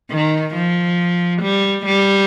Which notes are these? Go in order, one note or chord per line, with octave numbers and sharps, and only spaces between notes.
D#3
F3
G3
G3